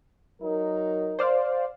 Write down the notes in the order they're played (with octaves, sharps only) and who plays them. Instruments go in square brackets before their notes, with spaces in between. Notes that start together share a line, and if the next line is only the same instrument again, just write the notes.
[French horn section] F#3 D#4 A#4
[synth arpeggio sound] C5 D5 F5